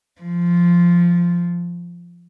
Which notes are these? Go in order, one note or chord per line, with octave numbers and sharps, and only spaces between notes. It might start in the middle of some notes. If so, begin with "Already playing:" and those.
F3